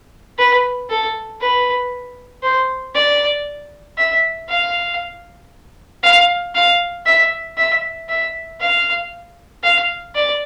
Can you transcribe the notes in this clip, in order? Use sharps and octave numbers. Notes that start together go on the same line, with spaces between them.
B4
A4
B4
C5
D5
E5
F5
F5
F5
E5
E5
E5
F5
F5
D5